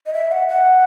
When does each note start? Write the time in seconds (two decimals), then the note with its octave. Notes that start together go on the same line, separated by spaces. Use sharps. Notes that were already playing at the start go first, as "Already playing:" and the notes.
0.06 D#5
0.13 E5
0.32 F#5
0.48 F#5